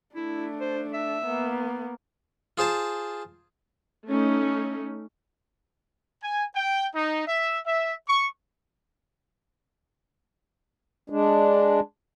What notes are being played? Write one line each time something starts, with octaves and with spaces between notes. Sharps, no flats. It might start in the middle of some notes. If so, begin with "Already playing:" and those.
A3 D4 E4
C5
E5
A#3 B3
F4 G#4 C5 A5
A3 C#4 D#4
G#5
G5
D#4
E5
E5
C#6
G#3 D4